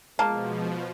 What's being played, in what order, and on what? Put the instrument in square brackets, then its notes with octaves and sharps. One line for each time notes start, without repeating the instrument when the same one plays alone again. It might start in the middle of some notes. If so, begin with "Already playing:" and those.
[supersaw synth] B2 F3 [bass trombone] G#3 [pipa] A#3 [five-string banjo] A5